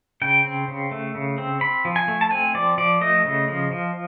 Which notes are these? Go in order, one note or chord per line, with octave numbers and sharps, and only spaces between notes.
C#3 G5
C4
C#3
A3
C#3
C4
C4 B5
F3
G#5
A3
A5
C4 G#5
F3 D5
F3 D5
A3 D#5
C#3
F3
F3